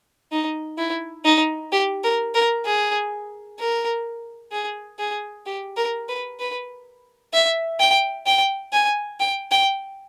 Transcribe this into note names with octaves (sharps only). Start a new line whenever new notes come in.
D#4
E4
D#4
G4
A#4
A#4
G#4
A#4
G#4
G#4
G4
A#4
B4
B4
E5
G5
G5
G#5
G5
G5